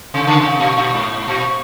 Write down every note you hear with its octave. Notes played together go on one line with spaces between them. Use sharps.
C3
C#3
C3
A#2
A#2
G#2
A#2